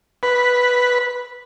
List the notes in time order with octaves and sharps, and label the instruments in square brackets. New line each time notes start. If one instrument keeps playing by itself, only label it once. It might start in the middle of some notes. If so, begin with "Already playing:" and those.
[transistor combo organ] B4